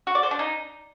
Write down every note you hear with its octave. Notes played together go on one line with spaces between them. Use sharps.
F#4
D5
C5
D4
D#4